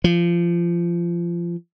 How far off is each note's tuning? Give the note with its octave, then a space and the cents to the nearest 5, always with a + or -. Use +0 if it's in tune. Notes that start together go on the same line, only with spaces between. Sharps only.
F3 -25